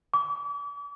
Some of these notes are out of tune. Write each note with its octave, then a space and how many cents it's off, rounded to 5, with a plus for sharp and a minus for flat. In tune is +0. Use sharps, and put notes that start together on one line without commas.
D6 -40